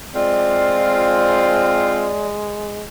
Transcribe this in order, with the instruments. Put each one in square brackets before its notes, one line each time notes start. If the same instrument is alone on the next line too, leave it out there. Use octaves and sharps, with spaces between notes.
[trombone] G#3 [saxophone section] C4 F4 [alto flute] D5